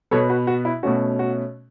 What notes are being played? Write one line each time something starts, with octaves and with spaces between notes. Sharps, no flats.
B2 B3 A4 C#5
F#4 B4
F#4
E4
B2 A3 C#4 F#4
F#4